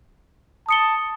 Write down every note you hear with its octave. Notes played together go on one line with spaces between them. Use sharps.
A5 D#6 C#7 G7